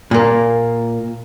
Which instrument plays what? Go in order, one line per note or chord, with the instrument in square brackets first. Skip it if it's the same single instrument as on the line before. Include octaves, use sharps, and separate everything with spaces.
[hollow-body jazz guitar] A#2 A#3